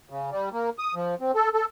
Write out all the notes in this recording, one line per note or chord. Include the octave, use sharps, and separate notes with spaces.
C#3
G3
A#3
D#6
F3
C4
A4
A4